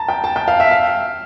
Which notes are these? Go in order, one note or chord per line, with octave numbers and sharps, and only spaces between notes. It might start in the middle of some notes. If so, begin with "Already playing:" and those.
Already playing: A5 A#5
G5
A5
G5
F5
E5
F5